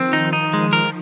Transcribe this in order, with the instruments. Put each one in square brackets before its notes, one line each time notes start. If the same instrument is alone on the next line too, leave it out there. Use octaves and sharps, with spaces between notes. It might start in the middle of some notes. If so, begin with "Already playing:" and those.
Already playing: [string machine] D#3 F3 [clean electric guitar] C4
[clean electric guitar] D#4
D#4
G#3
A#4